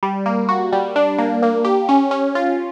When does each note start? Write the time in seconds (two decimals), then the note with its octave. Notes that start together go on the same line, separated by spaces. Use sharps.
0.03 G3
0.26 A#3
0.49 F#4
0.73 G3
0.96 D4
1.18 A#3
1.42 A#3
1.65 G4
1.89 C#4
2.11 C#4
2.35 F4